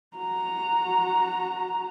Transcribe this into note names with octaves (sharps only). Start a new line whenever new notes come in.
F#4 A#5